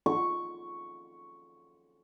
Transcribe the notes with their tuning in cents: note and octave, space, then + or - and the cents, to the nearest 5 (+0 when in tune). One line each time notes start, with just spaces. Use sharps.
C#6 +0